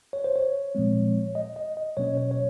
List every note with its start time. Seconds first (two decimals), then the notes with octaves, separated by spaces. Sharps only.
0.13 C#5
0.24 C5
0.36 C#5
0.75 A#2 F3 G#3 C4
1.35 D#5
1.56 D#5
1.77 D#5
1.97 B2 F#3 A#3 C#4 C#5
2.17 C#5
2.31 C#5